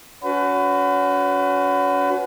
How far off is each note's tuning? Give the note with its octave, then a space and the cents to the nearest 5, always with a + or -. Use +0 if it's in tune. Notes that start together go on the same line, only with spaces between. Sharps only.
C#4 +35 F#4 +0 B4 +30